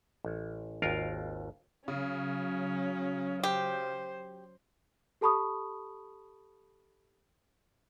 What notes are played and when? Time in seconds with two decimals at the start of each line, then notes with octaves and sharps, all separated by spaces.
0.25 A1
0.82 G#1 D#2 F4 A#4 F5
1.88 C#3 F#3 C#4
3.43 G4 C5
5.21 G4 A4 A5 B5 C#6 D#6